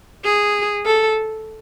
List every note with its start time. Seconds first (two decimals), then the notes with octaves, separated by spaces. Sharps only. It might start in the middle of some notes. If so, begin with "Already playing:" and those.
0.24 G#4
0.86 A4